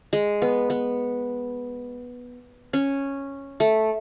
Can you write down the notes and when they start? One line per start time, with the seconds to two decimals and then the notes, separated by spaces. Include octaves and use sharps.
0.13 G#3
0.42 B3
0.70 B3
2.73 C#4
3.60 A3